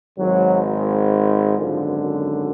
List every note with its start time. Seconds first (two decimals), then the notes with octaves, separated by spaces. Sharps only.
0.18 G#1 G#2 F#3
1.58 G#1 F#2 D3 F3